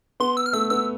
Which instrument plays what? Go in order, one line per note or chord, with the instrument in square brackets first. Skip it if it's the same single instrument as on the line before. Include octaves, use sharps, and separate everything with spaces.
[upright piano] B3 [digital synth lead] C6
[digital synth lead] E6
F6
[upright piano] A3 [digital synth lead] E6
[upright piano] B3 [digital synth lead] E6